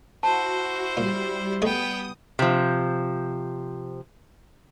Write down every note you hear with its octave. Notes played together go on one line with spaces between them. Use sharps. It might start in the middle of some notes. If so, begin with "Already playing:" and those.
E4 F#4 C5 A5
A#2 G3
A3 B3 G#4 D#5 G5 D#6
C3 F3